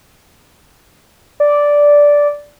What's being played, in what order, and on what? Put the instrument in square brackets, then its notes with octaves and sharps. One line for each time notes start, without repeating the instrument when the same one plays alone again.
[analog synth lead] D5